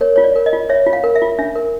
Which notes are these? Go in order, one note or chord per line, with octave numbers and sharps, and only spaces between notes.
A#4 C#5
F4 C#5
D5
A#4
D#5
F4
C#5 E5
F4
F5
A#4
E5
F4
D4 E5
A#4